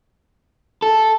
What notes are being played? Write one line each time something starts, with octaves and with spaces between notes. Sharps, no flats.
A4